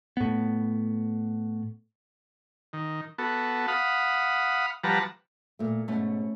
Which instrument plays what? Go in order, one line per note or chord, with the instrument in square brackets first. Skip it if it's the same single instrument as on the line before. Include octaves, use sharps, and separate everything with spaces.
[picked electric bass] A2 B3
[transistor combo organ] D#3
B3 F#4 A4
F5 F#5 B5 D#6
F3 G3 B4 F#5 A5 A#5
[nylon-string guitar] A#2 A3
[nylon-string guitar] G#2 B2 [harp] A3 C#4